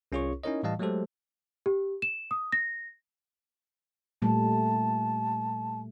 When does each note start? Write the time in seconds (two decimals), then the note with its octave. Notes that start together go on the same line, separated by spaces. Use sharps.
0.12 C2 C#4 F4 G#4 C#5 C#6
0.44 C#4 D#4 E4 A#4 C#5 D#5
0.63 A2 E3 G3 D#5 F5 A5
0.79 F#3 G#3 A3 G4 A4 C5
1.66 G4
2.02 E7
2.31 D#6
2.52 A#6
4.22 A#2 G3 A3 A5